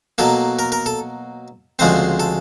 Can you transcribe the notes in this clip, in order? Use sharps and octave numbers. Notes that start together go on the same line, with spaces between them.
B2 F#3 A#3 A4
A#4
A#4
A4
D2 C#3 F3 G#3 C4 C5
A4